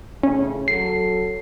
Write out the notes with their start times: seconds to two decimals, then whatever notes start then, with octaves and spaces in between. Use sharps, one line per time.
0.23 A2 C#3 C#4
0.68 F#3 A4 C7